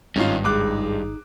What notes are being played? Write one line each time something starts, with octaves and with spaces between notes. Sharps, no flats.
G#1 G2 C#4 D#4 F4
C#2 D#4 G#4 D6 F#6